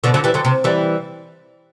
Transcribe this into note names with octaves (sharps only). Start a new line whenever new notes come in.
B2 D3
D3 F#3
E3 G3
D3 F#3
C3
E3 G3